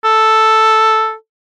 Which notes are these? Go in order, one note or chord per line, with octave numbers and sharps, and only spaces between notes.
A4